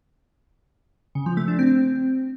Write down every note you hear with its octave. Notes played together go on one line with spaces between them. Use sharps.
C#3
F3
A3
D4
C4